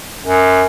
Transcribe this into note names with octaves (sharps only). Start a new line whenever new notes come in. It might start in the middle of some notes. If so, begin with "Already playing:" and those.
F#2